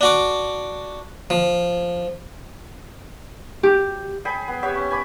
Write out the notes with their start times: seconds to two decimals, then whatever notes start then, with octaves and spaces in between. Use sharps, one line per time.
0.01 D4 F#4 D6
1.30 F3
3.63 G4
4.25 G#4 G5 B5
4.48 B3
4.63 B3 G4 C#5 E5
4.75 C#4
4.90 G#5 B5 D6